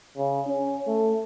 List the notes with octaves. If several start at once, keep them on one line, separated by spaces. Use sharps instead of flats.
C#3
C#4
A3